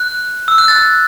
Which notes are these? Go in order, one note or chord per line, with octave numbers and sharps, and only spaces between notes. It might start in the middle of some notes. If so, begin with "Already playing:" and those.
Already playing: F#6
E6
F#6
A6
F#6